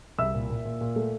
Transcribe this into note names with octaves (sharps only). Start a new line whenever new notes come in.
C2 E5 E6
A#2
A#2
A#2
A#2
A3